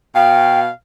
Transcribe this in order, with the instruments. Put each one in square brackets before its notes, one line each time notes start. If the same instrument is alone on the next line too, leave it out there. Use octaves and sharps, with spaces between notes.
[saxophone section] B2 F5 [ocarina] G5